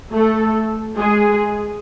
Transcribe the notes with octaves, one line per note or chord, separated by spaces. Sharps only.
A3 A4
G#3 G#4